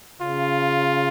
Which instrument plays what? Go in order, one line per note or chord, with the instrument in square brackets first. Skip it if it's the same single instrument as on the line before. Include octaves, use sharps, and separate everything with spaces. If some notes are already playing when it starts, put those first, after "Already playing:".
[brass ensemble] C#3 [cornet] F4